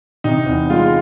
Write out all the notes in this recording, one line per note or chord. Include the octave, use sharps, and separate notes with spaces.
C3 D#4
E2
G#3 F4